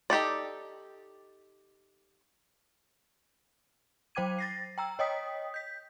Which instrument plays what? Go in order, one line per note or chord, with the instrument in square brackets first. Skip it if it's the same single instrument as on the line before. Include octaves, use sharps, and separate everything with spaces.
[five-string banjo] D#4 G4 A4 D5
[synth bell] F#3 C5 G5 D6 G#6 D#7
A6 A#6 C7
G5 A#5 E6
C#5 D#5 G5 D#6 B6
G6 B6